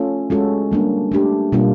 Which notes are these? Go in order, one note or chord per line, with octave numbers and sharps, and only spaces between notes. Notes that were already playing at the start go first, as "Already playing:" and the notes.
Already playing: A3 C#4 F4 A4
G#3 C#4 F#4 A4
G3 A#3 D4
A3 D4 G4
B2 G3 A#3 D4 F4